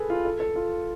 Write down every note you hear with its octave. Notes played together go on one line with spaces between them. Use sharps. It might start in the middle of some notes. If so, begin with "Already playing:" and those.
Already playing: G#4 A4 B4
F4
A4
A4
F4